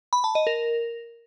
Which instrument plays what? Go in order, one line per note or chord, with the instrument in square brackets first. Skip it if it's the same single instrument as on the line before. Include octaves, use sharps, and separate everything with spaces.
[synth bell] B5
A5
D#5
A#4